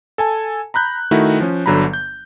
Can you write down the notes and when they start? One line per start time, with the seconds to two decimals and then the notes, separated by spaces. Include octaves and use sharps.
0.18 A4 G#5 A5
0.74 A#5 B5 F#6 G6
1.11 D#3 A3 D#4 E4 F#4
1.40 F3 C#4
1.66 G1 D3 F#3 A#5 B5
1.93 G6